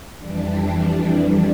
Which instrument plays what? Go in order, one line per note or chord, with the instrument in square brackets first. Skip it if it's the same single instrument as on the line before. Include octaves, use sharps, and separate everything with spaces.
[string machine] F2 E3 G3 D4